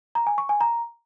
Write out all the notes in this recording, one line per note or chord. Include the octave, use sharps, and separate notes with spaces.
A#5
G#5
C#6
G#5
A#5